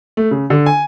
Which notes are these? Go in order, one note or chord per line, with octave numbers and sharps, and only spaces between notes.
A3
C#3
D3
G#5